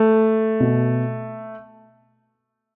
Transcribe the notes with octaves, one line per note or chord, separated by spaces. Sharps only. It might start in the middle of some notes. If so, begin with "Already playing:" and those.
Already playing: A3
B2